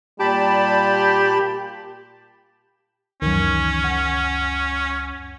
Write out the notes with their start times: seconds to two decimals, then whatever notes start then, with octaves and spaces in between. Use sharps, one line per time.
0.20 A#2 G3 G4 A5 B5
3.22 C#2 F#2 D#3 E3 C#4
3.84 F#5